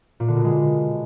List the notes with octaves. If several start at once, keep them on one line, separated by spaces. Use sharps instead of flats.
A#2
D3
B2
G#3